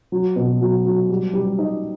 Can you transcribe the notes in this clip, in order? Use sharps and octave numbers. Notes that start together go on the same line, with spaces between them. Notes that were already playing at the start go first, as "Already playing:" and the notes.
F#3
B2
F#3
F#3
G3
G3
D#4